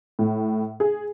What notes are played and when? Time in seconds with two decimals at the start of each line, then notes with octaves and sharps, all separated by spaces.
0.19 A2
0.80 G#4